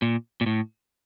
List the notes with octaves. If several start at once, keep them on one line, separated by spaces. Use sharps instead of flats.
A#2
A#2
A2